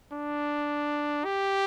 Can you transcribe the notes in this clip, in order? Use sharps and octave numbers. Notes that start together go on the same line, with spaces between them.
D4
G4